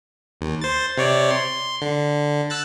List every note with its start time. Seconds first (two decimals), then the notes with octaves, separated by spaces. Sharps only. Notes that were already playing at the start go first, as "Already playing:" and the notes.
0.41 D#2
0.61 C5 A6
0.97 C3 C#5 D5
1.31 C6
1.82 D3
2.50 E6 F#6 A6